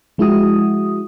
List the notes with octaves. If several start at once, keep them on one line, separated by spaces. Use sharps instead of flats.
F3 G#3 E4 F#4 D#6